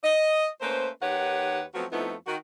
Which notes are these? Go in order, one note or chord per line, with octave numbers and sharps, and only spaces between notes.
D#5
A3 A#3 C#4 B4 C5
D#2 D#3 G4 B4 C#5 F#5
F3 F#3 A3 B3 C4 F#4
F2 F3 A3 B3 D#4 E4
D#3 F#4